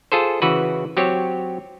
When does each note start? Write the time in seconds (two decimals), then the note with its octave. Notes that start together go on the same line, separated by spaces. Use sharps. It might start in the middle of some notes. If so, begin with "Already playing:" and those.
0.12 F4 G#4 A4 C5
0.42 C#3 E3 F#4 B4
0.97 F#3 C4 G4 C#5